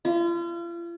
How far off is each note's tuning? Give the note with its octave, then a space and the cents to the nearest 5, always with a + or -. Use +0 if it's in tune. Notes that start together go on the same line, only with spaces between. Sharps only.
F4 -40